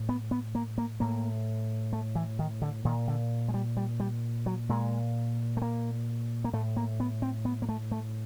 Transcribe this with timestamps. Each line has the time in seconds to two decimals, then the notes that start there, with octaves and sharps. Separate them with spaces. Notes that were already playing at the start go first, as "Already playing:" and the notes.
Already playing: A2
0.09 B3
0.31 B3
0.55 A#3
0.78 A#3
1.00 A2 A#3
1.93 A3
2.15 E3
2.39 D#3
2.62 D3
2.85 A#2 D#3
3.08 D3
3.48 G#3
3.54 G3
3.77 G3
4.00 G3
4.46 F#3
4.69 A#2 G#3
5.57 A3
5.62 A#3
6.44 A#3
6.53 A2 A3
6.77 A#3
7.00 B3
7.22 C4
7.45 B3
7.62 A#3
7.69 A3
7.91 A3